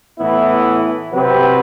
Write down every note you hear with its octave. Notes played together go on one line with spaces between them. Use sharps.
A2 E3 B3 E4
C3 F#3 C4 G4 B4